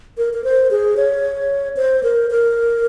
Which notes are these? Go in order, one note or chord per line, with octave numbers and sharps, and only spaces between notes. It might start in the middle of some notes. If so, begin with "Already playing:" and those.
A#4
A#4
C5
G#4
C#5
C5
A#4
A#4